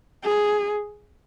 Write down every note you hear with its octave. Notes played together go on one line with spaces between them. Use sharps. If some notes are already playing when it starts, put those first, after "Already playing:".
G#4